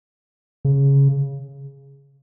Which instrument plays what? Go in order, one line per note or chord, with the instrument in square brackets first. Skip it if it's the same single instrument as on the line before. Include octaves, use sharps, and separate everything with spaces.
[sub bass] C#3